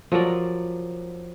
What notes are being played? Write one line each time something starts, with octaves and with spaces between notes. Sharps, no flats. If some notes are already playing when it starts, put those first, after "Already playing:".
F3 F#3 A#4 D5